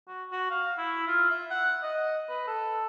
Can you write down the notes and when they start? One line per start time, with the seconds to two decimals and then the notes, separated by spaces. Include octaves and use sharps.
0.08 F#4
0.32 F#4
0.50 F5
0.78 E4
1.07 F4
1.30 E5
1.51 F#5
1.83 D#5
2.29 B4
2.47 A4